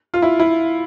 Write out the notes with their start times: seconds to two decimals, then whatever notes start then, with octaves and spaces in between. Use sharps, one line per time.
0.14 F4
0.22 E4
0.39 E4